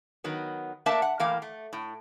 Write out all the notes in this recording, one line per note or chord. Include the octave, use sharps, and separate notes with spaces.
D#3 F#3 B3
A3 A#3 D4 A#4 E5 A5
F#5
A2 E3 A#3 F5 G5
A3
A2